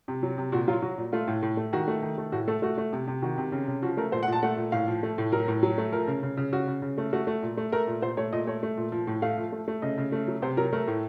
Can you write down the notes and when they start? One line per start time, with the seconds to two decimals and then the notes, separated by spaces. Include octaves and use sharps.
0.08 C3
0.23 F#3
0.38 C3
0.52 A#2 F#4
0.68 F#3 F4
0.82 F#3 F#4
0.98 A#2
1.12 A3 F4
1.28 A2
1.42 A2
1.57 A3
1.73 D#3 F#4
1.88 A3
2.02 D#3
2.18 A3
2.32 A2 F#4
2.48 A3 A4
2.62 A3 F#4
2.78 A3
2.93 C3
3.07 C3
3.22 D#3 F#4
3.38 C3
3.52 C#3
3.68 C#3
3.82 F3 F#4
3.97 A3 A#4
4.12 A#2 C5
4.23 F#5
4.28 A#2 A5
4.43 A3 F#5
4.57 A#2
4.72 A2 F5
4.88 F3
5.03 A3
5.18 A2
5.32 F#3 A#4
5.48 A2
5.63 F#3
5.78 A3
5.92 F3 A#4
6.07 C#3
6.23 C#3
6.37 C#3
6.52 C#3 F#4
6.68 C#3
6.82 C#3
6.98 A3
7.13 A3 F#4
7.27 A3
7.42 A#2
7.57 A3
7.72 A3 A#4
7.87 A#2
8.02 A#2 C5
8.17 A3 C#5
8.33 A#2 D#5
8.47 A3 C#5
8.63 A3
8.77 A#2
8.92 F3
9.07 A2
9.22 A3 F5
9.38 F3
9.52 A3
9.68 A3
9.82 C#3 D#5
9.98 C#3
10.12 A3
10.28 F#3
10.42 C3 C5
10.57 F#3 A#4
10.73 A3 A#4
10.88 A2